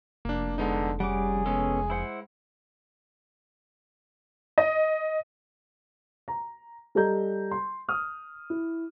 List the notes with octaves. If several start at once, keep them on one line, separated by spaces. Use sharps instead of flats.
F1 A#3 D4
D3 G#3 B3 D#4
G3 C#4 G#4 F#5 D6
G#3 B3 C#4 A4
E4 C5 F#5
D#5
A#5
G3 A4 D#5 A#5 G6
C6
D#6 F6
E4